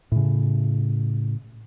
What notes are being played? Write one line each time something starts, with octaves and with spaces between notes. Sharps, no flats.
A2 C#3